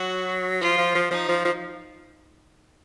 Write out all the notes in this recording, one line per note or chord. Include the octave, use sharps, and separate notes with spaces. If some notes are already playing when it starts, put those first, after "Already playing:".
Already playing: F#3 F#4
F3 F4
F3
F3
F3 D#4
F3
F3